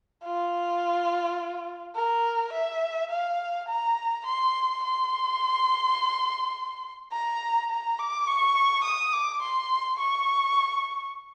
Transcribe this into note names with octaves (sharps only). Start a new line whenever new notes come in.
F4
A#4
E5
F5
A#5
C6
C6
A#5
A#5
D6
C#6
D#6
D6
C6
C#6